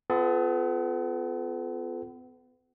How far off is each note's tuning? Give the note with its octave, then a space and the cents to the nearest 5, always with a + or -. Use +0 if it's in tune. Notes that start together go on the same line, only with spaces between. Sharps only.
B3 +35 F4 +0 A4 -30